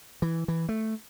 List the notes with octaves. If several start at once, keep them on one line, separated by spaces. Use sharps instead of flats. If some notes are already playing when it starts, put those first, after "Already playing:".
E3
E3
A3